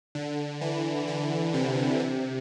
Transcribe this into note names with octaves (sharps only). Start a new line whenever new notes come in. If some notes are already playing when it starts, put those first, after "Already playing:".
D3
E3
D3
C3
C3